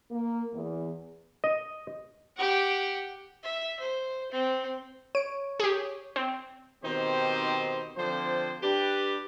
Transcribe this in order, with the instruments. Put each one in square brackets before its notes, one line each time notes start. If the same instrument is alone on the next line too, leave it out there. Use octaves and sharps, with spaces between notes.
[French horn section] A#3
E2
[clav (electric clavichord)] D#5
[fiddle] G4 F#5
E5
C5
C4
[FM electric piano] C#5 [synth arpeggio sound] D7
[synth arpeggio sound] G4 G#4
C4
[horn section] B2 D#3 C4 D#4 G4 C5
D3 F3 C4 C5
D4 G4 B4